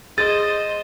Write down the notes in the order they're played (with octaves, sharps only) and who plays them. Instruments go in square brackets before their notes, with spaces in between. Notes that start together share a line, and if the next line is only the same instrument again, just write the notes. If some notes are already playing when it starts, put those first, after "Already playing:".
[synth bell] G#4 [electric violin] C5 D#5 [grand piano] A6